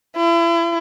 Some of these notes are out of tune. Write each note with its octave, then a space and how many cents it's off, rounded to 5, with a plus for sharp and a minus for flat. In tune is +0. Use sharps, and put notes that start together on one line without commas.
E4 +35